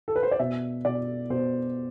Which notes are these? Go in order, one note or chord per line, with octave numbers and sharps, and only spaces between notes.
A4
B4
C5
D5
B2 E5
B2 D5
B2 C5